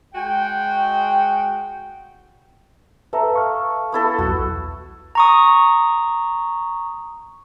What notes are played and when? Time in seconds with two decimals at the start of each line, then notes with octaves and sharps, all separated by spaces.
0.15 G#3 F#4 G5
3.13 A4 B4 E5 A#5
3.34 F5 C#6 F6
3.92 B3 E4 A4
4.19 B1 E2 F#4
5.15 A#5 C#6 D#6